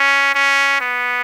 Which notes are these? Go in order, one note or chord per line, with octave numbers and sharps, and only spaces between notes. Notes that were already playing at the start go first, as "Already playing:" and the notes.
Already playing: C#4
C#4
B3